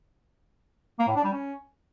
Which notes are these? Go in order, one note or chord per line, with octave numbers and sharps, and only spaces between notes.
A#3
A2
D4
G3
C#4